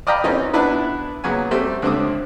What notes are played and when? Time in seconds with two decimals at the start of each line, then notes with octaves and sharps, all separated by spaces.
0.07 D5 D#5 F5 G5 A#5 B5
0.24 E3 C4 C#4 D#4
0.53 B3 D4 E4 B4
1.24 A#2 C#3 F#3 B3 G#5
1.51 G3 A3 C4
1.82 C#2 D3 C4 E5 D6 D#6